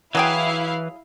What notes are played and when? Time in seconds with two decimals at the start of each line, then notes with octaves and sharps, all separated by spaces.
0.15 E3 F#3 E4 G#4 F5 G5